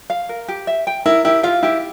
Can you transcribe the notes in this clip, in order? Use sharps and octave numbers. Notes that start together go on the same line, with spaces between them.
F5
A#4
G4
E5
G5
E4 A#4
E4 G4
F4 F5
E4 G4